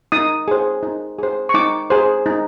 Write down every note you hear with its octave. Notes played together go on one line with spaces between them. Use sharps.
D#4 D#6
G#4 C5
D#4
G#4 C5
C#6
D#4 D6
G#4 C5
D#4